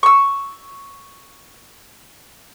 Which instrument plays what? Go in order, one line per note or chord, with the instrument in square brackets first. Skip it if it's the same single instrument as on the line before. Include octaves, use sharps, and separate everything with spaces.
[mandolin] C#6 E6